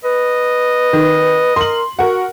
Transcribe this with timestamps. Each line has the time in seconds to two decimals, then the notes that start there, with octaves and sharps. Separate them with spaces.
0.04 B4 D#5
0.93 D#3
1.56 A#4 C6 F#7
1.99 F#4 A#4 F#5